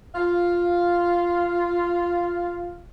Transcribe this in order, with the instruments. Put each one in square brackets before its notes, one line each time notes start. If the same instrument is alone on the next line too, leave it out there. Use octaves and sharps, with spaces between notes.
[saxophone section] F4 F5